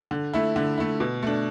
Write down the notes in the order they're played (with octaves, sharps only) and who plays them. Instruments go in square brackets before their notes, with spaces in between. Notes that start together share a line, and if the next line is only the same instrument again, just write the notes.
[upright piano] D3
A3 E4
D3
A3 E4
B2
A3 D4